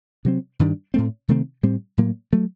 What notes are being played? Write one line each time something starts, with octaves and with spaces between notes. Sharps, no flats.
C3 F#3 C4
G2 D#3 G3 D4
A2 A3 C4
C3 D#3 A3 C4
A2 G3 C4
A2 F#3 A#3
F#3 A3